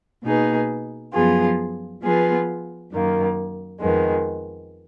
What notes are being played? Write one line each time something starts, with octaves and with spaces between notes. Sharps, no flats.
B2 A#3 D#4 G#4 B4
F#2 F3 B3 F4 G#4
F3 B3 F4 G#4 B4
F#2 D#3 A#3
F2 D#3 G#3 B3